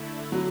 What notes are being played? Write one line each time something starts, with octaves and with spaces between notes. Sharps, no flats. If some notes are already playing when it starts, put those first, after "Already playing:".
Already playing: D3 A3 E4
F#3